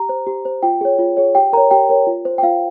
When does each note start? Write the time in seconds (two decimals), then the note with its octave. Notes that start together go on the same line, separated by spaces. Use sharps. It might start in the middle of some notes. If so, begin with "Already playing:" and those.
Already playing: G4 A#5
0.09 C5
0.27 G4
0.45 C5
0.63 F4 G5
0.81 G#4 C#5
0.99 F4
1.17 G#4 C#5
1.35 G4 G5
1.53 A#4 A#5
1.57 C#5
1.71 G4 G5
1.89 A#4 C#5
2.07 F4
2.25 C5
2.38 G5
2.43 F4 F5